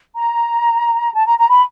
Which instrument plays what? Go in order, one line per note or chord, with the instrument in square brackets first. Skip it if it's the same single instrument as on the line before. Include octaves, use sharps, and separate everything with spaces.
[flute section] A#5
A5
A#5
A#5
B5